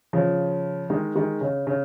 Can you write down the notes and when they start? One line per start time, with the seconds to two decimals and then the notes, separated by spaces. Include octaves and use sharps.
0.13 C#3 F3
0.90 D#3 G#3
1.15 D#3 G#3
1.41 C#3
1.67 C#3